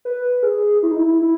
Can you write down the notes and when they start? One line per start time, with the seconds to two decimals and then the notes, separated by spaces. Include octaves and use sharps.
0.05 B4
0.43 G#4
0.83 E4
0.91 D#4
0.99 E4
1.21 E4